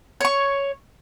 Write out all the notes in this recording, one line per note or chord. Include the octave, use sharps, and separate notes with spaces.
C#5 C#6